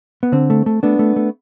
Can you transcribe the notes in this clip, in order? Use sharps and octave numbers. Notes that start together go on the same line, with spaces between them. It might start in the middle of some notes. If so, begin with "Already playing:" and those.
B3
D3 C4
A3
A3
A3 B3 D4
A3
A3